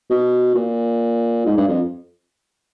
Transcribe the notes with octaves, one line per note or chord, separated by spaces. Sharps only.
B2
A#2
G#2
G2
F2